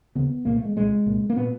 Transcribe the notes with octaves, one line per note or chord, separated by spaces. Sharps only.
D#2 C#3 B3
C2 A#2 A#3
A3
G#3
C2 A#2 G#3
C2 A#2
A#3
A#2 B3